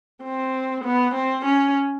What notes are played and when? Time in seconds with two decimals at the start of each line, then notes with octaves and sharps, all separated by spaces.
0.23 C4
0.84 B3
1.15 C4
1.45 C#4